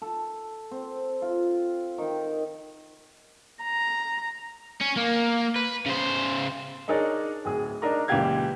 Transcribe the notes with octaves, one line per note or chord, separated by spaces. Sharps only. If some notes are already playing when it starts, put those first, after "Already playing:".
A4
C4
F4
D#3 G5
A#5
C#4
A#3
B4
C#3 C5
D4 D#4 G#4 A#4 C#5 D5
D1 G#4
D4 D#4 A#4 A#5
C#2 A#2 E3 G4 F5 G#6